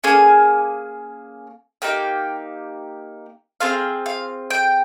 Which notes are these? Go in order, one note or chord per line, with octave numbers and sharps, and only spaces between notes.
A#3 C#4 G#4 G#5
A#3 D#4 G4 G5
C4 F4 G#4 F5
F5
G5